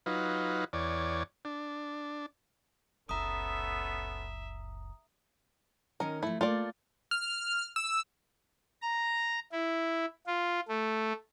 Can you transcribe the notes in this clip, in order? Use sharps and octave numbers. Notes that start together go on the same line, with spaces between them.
F#3 D#4 F4 B4
E2 C#5 D5
D4
F#1 C#2 B3 C#4 A4 E5 A#5 D#6
D#3 C#4 A#4 D#5
F3 A3 E4
A3 A#3 F4 D5
F6
E6
A#5
E4
F4
A3